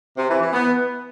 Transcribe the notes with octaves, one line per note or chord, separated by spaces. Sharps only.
C3
E3
E3
B3